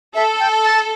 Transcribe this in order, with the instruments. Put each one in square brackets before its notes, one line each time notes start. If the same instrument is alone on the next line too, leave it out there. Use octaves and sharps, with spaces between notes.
[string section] A4 [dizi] E5
[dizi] G5
A5